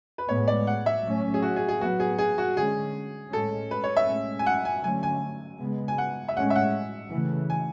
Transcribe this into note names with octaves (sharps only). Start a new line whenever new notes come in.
B4
A2 G#3 B3 C#5
D5
F#5
E5
A2 F#3 A3 C#4
G#4
F#4
G#4
G#4
A2 F#3 B3 F#4
G#4
G#4
F#4
D3 G#3 C#4 G#4
A2 G#3 C#4 A4
B4
C#5
E5
A2 G#3 C#4
G#5
F#5
G#5
D3 F#3 A3 C#4 G#5
G#5
C#3 G#3 B3
G#5
F#5
E5
A2 G#3 C#4 F#5
E5
F#5
C#3 E3 A3
G#5